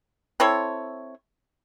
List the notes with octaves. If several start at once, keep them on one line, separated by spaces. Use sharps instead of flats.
C4 E4 A4 C#5